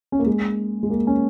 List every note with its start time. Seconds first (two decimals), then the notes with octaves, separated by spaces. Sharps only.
0.12 C#4
0.19 A#3
0.26 G#3
0.83 G#3
0.90 A#3
1.07 C#4